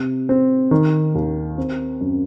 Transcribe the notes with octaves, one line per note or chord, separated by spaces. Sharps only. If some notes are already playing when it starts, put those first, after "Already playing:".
Already playing: C3
C4
D#3
D#2
C4
F#2